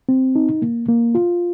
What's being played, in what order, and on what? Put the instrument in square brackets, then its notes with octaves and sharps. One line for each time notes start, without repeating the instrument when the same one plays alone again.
[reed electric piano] C4
D#4
A#3
A#3
F4